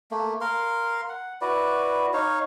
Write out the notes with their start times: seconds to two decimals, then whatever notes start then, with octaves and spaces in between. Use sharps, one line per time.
0.11 A3 A#3
0.41 A#4 F5 C6
1.09 F#5
1.41 E4 F#4 B4 D5
2.13 D#4 C#5 F5